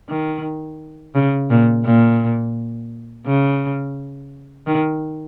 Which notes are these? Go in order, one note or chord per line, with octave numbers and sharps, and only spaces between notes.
D#3
C#3
A#2
A#2
C#3
D#3